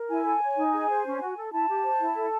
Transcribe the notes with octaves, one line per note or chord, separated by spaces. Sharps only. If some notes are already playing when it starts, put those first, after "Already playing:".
Already playing: A#4
E4 G#5
A4
C#5
D#4
G#4
C5
C#4
F#4
A4
E4 A5
G4
C5
E4
A4